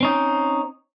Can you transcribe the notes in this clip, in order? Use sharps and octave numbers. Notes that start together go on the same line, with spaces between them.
C4 C#4 D#4